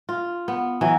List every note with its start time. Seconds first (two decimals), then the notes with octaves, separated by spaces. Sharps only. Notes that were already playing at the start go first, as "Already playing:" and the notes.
0.09 F4
0.48 B3
0.81 E3 F#3